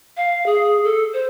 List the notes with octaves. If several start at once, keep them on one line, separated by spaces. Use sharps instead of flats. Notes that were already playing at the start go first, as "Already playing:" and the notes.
F5
G#4
A4
C5